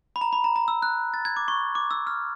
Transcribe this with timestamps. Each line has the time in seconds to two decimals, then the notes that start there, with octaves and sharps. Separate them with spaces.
0.16 B5
0.21 A#5
0.33 B5
0.44 A#5
0.56 A#5
0.68 E6
0.82 F#6
1.14 A6
1.25 G#6
1.37 D6
1.48 C#6
1.75 D6
1.91 E6
2.07 F6